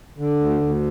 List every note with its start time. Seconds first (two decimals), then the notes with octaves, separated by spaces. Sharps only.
0.18 D3
0.40 D2
0.61 D2